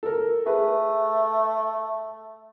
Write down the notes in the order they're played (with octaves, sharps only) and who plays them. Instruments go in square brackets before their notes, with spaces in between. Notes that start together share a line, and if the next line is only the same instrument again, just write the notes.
[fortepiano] A4 A#4
[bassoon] A3 [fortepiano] G#4 B4